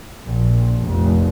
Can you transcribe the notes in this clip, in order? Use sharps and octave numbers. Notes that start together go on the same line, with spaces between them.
A#1
F1